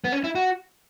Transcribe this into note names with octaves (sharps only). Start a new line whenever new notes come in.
B3
C#4
E4
F#4